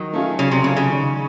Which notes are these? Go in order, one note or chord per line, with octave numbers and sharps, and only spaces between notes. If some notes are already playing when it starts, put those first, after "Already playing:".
Already playing: D#3 F#3
A3 C#4 F4 G#4
C#3 F#3
C3
C#3 A3 C#4 F4 G#4
C#3
D#3